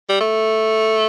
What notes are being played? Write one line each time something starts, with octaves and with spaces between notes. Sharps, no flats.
G3
A3